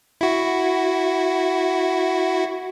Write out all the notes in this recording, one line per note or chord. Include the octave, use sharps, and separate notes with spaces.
E4 F#4